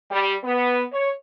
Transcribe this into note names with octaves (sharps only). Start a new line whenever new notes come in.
G3
B3
C#5